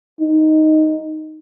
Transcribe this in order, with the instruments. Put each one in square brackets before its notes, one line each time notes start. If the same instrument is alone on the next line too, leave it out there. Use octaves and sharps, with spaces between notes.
[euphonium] D#4